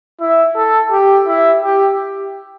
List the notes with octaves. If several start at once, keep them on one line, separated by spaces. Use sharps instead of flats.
E4
A4
G4
E4
G4